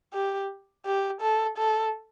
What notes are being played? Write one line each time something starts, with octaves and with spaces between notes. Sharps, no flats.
G4
G4
A4
A4